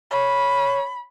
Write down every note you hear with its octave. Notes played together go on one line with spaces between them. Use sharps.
C#5 B5